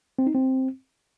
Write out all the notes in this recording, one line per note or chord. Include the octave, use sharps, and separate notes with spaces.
C4
D#4
C4